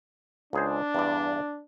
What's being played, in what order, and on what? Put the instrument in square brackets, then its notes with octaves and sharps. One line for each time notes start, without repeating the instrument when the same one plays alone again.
[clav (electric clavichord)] C#2 G#4 C5 [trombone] D4
[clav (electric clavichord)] E2 G2 D5